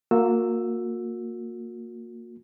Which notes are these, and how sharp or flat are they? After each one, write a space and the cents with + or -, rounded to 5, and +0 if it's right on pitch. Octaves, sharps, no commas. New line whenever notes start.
A#3 -15 F#4 -40 E6 +0